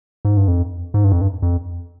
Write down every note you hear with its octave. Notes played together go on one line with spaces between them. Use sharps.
G#2
G2
F2
G#2
G2
F2
G2
F2